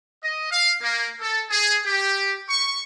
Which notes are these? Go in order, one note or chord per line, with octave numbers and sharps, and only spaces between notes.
D#5
F5
A#3
A4
G#4
G4
C#6